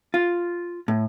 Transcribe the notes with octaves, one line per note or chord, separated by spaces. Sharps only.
F4
A2